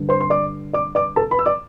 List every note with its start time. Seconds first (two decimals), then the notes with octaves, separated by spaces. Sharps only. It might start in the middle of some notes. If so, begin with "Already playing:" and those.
Already playing: G2 D3
0.09 C5 C6
0.21 C6
0.30 D5 D6
0.73 D5 D6
0.95 D5 D6
1.16 A4 A5
1.31 B4 B5
1.39 E6
1.46 D5 D6